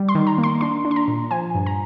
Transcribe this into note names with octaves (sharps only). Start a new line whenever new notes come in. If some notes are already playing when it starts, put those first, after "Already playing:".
Already playing: G3
C6
D#3
A#5
A#3
C6
D4 C6
D4
C6
A#5
A#2
F3 G#5
G2
A#5